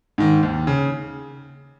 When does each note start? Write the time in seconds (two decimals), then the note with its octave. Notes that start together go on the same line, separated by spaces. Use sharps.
0.18 G#2 D#3
0.43 D#2
0.67 C#3